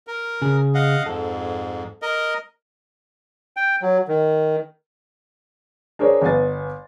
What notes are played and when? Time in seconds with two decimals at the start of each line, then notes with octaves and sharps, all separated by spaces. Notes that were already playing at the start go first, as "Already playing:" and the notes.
0.07 A#4
0.42 C#3 G#4
0.75 D#5 F5 F#5
1.06 F2 G#2 A4
2.02 A#4 D#5
3.57 G5
3.82 F#3
4.08 D#3
5.99 D4 G#4 A#4 C5 C#5
6.22 G1 B3 G#5 A6